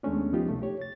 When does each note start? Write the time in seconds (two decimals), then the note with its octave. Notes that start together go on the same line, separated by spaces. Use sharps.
0.03 D#2 G#3 A3 B3 C#4 D4
0.33 F3 B3 D#4 F4 G4
0.49 C2 A3
0.62 G4 C#5
0.81 A6